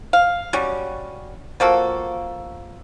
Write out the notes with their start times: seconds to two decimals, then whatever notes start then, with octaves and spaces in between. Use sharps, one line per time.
0.13 F5
0.53 F#3 G3 C#4
1.60 F3 A#3 F#4 A4